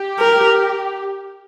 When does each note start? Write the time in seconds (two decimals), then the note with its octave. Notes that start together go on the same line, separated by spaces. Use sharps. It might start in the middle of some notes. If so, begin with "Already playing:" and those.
Already playing: G4
0.20 A#4